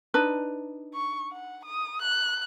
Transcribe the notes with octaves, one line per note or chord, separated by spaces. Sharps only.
D4 D#4 B4
C#6
F#5
D#6
F#6